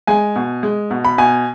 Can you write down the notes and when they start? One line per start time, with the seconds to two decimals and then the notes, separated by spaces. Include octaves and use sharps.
0.07 G#3 G#5
0.36 B2
0.63 G#3
0.91 B2
1.05 B5
1.18 B2 G#5